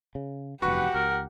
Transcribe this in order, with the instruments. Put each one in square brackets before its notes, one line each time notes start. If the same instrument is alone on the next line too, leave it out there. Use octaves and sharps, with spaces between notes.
[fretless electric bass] C#3
[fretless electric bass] F1 E2 G2 [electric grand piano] F#4 C#6 [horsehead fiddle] G4 F#5 [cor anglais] B4
[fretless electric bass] C#2 [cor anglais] A#4